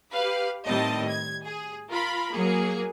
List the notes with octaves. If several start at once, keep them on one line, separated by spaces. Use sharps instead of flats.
G4 B4 F5
A2 D#3 G3 C4 D#5 A5
G#6
G#4
F4 A#4 B5
F#3 A#3 G#4